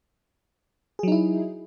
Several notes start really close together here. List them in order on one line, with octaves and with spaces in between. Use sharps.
G#4 F#3 D#4 E4